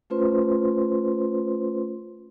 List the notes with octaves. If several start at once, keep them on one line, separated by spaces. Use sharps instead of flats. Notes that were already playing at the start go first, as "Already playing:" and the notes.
A3 C#4 F4 B4 C5 C6